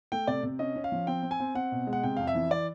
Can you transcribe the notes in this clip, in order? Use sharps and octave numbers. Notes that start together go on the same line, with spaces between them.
A3 G5
C3 D5
C3
C#4 D#5
C#4
F5
F3
C4 G5
C4
G#5
C4
C4 F#5
B2
G#3
F#5
C3 G5
F2 F5
E5
E3
D5